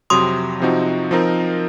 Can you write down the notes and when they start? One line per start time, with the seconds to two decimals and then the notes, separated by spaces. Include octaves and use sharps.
0.10 F2 C3 F#3 C6 D#6
0.60 C3 F3 C4 D#4 F#4
1.11 F3 C4 D#4 A#4